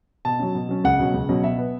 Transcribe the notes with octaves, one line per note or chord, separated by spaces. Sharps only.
B2 A5
F#3 C#4
B2
F#3 C#4
C#2 F#5
B2 F#3 C#4
C#2
B2 F#3 C#4
B2 E5
B3